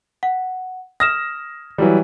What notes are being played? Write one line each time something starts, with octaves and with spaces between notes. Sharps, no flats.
F#5
D#6 F6 A#6 E7
E3 F#3 G3